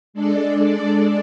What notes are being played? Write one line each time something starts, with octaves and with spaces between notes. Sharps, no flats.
G#3 D4 A4 D5